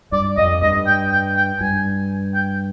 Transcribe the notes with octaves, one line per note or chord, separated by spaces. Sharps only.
G2 D5
F2 D#5
G2 D#5
G5
G5
G5
G2 G#5
G5